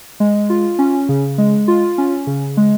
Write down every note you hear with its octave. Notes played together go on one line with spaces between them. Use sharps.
G#3
F4
C#4
C#3
G#3
F4
C#4
C#3
G#3